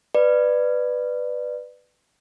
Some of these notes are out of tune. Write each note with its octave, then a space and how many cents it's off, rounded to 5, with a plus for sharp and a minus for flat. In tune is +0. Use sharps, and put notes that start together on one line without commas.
B4 +5 D5 +20